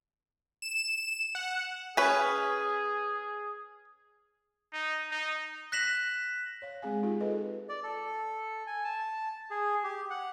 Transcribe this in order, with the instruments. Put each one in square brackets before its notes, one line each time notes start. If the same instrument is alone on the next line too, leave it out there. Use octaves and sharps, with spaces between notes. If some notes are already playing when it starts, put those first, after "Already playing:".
[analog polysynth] E7
F#5
[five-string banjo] C#4 B4 [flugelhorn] G#4
[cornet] D#4
D#4
[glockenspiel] F#6 A#6 B6 E7 F#7
[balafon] C#5 F5
G#3 C4 G#4 F5 G#5
D#4 F4 G4 G#4
F4 G#4 A4 B4 D#5
[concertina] D5
A4
G#5
A5
G#4
G4
F#5